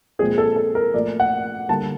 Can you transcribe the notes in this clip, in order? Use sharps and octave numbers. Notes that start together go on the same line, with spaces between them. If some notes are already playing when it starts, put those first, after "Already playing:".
A#2 F3 G#3 C4 G#4
A4
A4
A#4
A#2 F3 A3 D5
F#5
D3 G3 A#3 A5